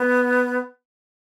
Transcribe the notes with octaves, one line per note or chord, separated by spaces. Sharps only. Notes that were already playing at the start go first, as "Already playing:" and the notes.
Already playing: B3